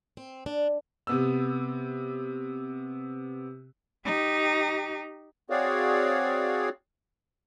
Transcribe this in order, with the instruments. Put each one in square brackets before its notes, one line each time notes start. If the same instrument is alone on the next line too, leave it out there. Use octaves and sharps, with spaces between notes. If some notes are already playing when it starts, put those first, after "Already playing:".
[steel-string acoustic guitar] C4
D4
[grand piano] C3 B3 E6
[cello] D#4 G4
[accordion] C4 F#4 G#4 C#5 D5 F5